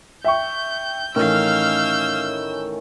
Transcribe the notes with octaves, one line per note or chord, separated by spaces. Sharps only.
E5 G5 C#6 G6
A2 D#3 E3 C#4 F5 E6 F6 G6